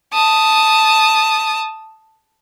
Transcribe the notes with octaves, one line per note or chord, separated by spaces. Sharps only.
A5 D#6